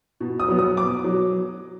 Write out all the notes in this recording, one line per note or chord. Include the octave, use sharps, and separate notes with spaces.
B2
D#6
F#3 B3
D#6
B2 D6
F#3